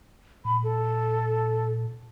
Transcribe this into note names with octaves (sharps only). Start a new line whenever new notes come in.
A#2 B5
A4